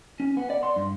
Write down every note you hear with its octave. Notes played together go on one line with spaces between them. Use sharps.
C#4
B3
D5
C6
G2